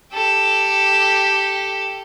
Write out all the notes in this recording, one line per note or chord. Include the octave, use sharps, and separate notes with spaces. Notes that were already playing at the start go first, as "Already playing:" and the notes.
G4 A4